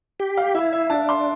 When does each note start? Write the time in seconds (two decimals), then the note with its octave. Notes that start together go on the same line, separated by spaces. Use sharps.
0.20 G4
0.37 F5
0.55 E4 E5
0.73 E5
0.90 D4 A5
1.09 C6